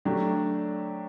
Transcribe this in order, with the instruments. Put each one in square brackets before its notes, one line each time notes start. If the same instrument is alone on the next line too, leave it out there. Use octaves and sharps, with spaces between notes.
[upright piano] F#3 A3 D4 G4